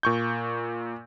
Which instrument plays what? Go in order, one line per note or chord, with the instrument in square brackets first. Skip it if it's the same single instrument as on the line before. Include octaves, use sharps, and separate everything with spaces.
[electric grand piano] A#2 C#6 G6